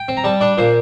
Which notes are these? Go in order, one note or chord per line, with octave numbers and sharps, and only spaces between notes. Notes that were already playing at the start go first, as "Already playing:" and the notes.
Already playing: G5
C4
A#5
G3 A5
D4 D5
A#2 C5